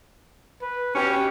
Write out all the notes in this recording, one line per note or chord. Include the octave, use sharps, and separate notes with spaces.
B4
B2 C#4 G4